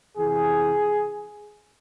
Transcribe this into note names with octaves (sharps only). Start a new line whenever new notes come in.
C3 E3 G#4